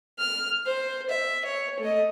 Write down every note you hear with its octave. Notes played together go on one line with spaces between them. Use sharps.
F6
C5
E5
C#5
A3 D#5